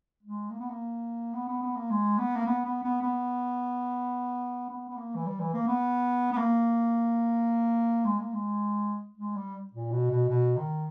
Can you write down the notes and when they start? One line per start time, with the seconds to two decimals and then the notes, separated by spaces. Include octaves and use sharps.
0.23 G#3
0.50 A#3
0.60 B3
0.70 A#3
1.34 B3
1.48 B3
1.62 B3
1.76 A#3
1.90 G#3
2.18 B3
2.36 A#3
2.46 B3
2.65 B3
2.83 B3
3.02 B3
4.70 B3
4.89 B3
4.98 A#3
5.15 E3
5.26 G3
5.39 E3
5.54 A#3
5.67 B3
6.32 B3
6.38 A#3
8.05 G#3
8.19 A#3
8.33 G#3
9.17 G#3
9.35 G3
9.73 A#2
9.92 B2
10.10 B2
10.29 B2
10.57 D#3